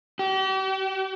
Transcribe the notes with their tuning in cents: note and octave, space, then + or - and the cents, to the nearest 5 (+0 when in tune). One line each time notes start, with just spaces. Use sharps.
G4 -40